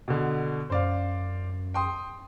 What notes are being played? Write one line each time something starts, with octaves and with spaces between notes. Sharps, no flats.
B2 D3
F#2 C5 D5 F5
G5 C6 D#6